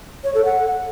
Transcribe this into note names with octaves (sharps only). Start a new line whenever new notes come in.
C#5
A4
F#5